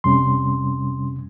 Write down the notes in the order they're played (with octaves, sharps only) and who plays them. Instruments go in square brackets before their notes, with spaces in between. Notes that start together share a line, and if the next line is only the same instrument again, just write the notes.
[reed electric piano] F2 C3 G3 C#4 C6